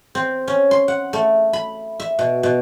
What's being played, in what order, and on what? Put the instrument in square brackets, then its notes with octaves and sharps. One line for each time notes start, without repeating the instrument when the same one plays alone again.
[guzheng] C4
C#4
C6
F#5
A3
B5
E5
B2
B2